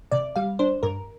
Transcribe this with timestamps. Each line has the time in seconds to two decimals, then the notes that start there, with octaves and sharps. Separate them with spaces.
0.11 C3 D5
0.36 G3 F5
0.59 D4 C5
0.83 G2 A#4